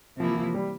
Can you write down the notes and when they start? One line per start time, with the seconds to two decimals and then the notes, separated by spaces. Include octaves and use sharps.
0.19 C3 E3 F3 A#3 E4
0.37 F3
0.54 G3